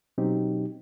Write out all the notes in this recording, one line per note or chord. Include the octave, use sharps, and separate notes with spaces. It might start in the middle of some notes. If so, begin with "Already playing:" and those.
B2 F#3 C4 C#4 D#4 G4